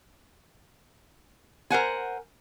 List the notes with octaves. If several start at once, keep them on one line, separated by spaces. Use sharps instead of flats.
A#4 C5 F#5 G#5